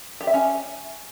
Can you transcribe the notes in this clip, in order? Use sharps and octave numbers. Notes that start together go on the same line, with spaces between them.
G4
E5
C#4